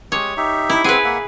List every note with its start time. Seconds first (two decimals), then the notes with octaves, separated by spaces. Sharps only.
0.12 G#3 G4 C#5 D#6
0.37 D#4 G4 E5
0.69 E4
0.84 C4 G#4 B4 F#5
1.05 A#3 E5 F#5